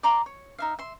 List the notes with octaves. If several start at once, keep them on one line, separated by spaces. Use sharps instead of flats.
D5 A#5 C6 D6
C#5
D#4 E5 F5
E5 C6